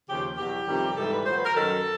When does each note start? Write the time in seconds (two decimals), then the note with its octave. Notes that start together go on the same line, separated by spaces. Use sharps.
0.08 D#2 C#3 F3 G4
0.37 E2 B2 F#3 G4
0.67 F2 C3 D#3 G3
0.96 G#2 E3 G3 A4
1.11 B4
1.26 A#2 F#3 C5
1.35 B4
1.45 A#4
1.56 F#2 D#3 F#3 A4